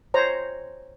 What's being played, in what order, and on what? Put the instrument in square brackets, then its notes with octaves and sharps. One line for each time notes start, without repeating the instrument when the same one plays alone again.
[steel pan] C5 C#5 A#5